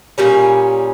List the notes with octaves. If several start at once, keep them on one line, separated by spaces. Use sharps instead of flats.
A#2 G3 C#4 G#4